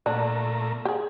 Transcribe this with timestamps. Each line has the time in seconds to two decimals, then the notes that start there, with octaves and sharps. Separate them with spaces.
0.06 A#2 D3 A3 D4 A#5
0.85 G4 G#4